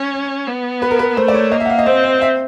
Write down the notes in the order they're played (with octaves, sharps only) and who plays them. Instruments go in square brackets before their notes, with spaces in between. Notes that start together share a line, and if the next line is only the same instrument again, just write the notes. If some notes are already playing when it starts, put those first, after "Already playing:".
Already playing: [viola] C#4
B3
[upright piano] B4
A#4
B4
[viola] A3 [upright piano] C5
[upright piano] D5
C#5
[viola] A#3 [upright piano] D#5
[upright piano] E5
F#5
F5
D#5
[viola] C4 [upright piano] C5
[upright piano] C5
E5